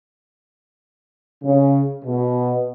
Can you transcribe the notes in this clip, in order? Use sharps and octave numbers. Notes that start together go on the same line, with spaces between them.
C#3
B2